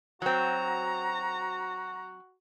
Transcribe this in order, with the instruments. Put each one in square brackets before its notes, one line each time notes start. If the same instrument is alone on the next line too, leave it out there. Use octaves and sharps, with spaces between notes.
[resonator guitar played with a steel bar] F#3 C4 [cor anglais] F#4 [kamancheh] A#5